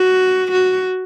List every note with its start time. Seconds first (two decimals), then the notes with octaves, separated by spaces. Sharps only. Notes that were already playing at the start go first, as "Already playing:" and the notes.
Already playing: F#4
0.51 F#4